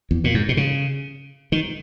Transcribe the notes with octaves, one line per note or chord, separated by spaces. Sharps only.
E2
A#2
G#2
B2
C#3
D#3